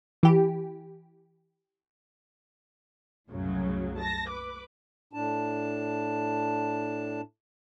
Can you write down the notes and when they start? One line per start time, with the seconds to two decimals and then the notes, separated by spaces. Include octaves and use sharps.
0.23 E3 G4
3.30 C2 F#2 A2 C#3 F#3
3.98 A5 A#6
4.29 B4 D6
5.13 A2 D4 A5